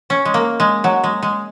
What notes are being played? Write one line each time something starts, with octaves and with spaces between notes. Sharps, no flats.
C#4
G#3
A#3
G#3
F#3
G#3
G#3